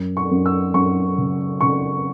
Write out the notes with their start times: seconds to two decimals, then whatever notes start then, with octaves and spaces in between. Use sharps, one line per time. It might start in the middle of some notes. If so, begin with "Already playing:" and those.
Already playing: F#2
0.17 C#6
0.31 F#2
0.46 E6
0.74 F#2 C#6
1.18 C#3
1.61 C#3 C#6